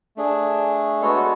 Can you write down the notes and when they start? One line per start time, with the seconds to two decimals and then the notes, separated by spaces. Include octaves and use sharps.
0.17 A3 D4 G#4
1.01 G#3 B3 F#4 A4 C#5